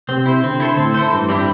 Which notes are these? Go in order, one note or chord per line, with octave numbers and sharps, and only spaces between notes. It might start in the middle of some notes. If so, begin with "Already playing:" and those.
C3 C4
E4 C5
D3 C4
E4 A4 C5
A2 C4
E4 A4 C5
G2 E3
G3 C4 E4 G4